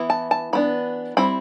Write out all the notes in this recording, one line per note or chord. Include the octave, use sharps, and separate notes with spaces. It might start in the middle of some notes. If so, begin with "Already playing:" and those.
Already playing: E3 B3 E4
A5
A5
E3 B3 D4 B5
G3 C4 E4 B5